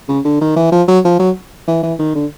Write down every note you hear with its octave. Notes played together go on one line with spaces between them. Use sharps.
C#3
D3
D#3
E3
F3
F#3
F3
F#3
E3
E3
D#3
D3